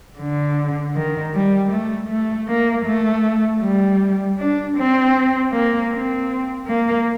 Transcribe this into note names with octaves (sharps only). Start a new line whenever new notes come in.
D3
D#3
G3
A3
A3
A#3
A3
G3
D4
C4
A#3
C4
A#3